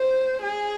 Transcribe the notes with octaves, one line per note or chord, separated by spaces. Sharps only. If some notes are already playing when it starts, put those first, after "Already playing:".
Already playing: C5
G#4